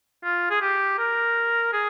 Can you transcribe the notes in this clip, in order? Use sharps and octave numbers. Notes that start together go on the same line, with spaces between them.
F4
G#4
G4
A#4
G#4